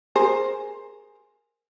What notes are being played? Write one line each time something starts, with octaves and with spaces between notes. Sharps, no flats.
G#4 A#4 C5